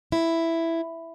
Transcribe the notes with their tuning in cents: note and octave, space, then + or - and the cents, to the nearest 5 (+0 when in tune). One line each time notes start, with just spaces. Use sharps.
E4 +5